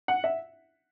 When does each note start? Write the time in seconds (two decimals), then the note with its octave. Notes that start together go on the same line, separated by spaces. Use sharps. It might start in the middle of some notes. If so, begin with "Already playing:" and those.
0.08 F#5
0.24 E5